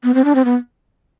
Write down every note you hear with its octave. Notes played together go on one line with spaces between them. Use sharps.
B3
C4
D4
C4
B3